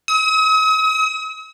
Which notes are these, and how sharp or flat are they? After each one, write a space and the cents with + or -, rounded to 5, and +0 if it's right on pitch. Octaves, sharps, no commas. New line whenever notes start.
D#6 +45